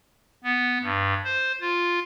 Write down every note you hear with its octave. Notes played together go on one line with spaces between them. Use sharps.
B3
G2
C5
F4